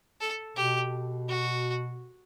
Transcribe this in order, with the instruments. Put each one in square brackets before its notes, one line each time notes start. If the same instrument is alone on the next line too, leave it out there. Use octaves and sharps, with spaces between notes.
[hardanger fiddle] A4
[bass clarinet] B2 [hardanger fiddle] G4
[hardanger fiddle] F#4